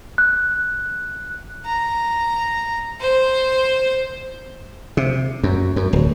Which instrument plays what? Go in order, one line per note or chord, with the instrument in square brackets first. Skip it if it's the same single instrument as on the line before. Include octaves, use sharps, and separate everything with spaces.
[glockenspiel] F#6
[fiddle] A#5
C5
[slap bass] C3
F#2
F#2
D1